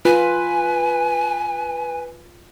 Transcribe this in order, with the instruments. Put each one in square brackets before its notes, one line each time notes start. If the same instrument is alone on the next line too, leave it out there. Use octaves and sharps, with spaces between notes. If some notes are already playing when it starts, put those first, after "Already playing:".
[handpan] F4 [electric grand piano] B4 [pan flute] G#5